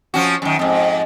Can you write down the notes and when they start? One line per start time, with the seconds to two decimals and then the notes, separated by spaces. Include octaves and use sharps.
0.14 F3 C#4 F#4
0.42 F#2 D#3
0.59 F2 G#2 D#5